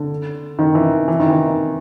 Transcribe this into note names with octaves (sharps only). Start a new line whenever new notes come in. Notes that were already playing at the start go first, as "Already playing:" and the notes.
Already playing: D3
D#3
E3
E3
D#3
E3